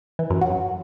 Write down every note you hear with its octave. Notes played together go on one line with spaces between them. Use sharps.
E3
F#2
F#3